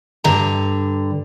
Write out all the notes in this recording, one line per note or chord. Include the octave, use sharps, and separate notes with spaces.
G2 D3 A#5